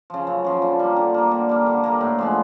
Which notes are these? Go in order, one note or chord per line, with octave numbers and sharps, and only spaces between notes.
C#3 F3
F#2
C#3 F3
D3
G3 A#3
D3
G3 A#3
D3
G3 A#3
D3
G3 A#3
A2
F3 G#3 B3